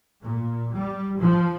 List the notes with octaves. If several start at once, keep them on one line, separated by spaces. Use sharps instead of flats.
A#2
G3
F3